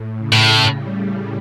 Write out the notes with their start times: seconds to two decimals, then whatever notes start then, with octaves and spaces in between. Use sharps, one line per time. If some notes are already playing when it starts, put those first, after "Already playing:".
Already playing: A2
0.18 C#3
0.32 A2
0.46 C#3
0.75 G3